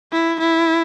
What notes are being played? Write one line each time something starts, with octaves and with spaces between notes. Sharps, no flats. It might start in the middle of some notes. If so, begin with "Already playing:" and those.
E4
E4